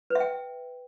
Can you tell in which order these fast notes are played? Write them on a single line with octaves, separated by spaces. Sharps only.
B4 E5 G5